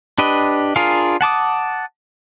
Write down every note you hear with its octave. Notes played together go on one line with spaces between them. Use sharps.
D4 G4 B4 D#5
D4 F4 G#4 A#4 F5
F#5 A5 D6 D#6